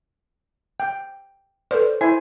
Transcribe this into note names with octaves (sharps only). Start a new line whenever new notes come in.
G5
A4 B4 C5 D5
E4 C5 E5 G#5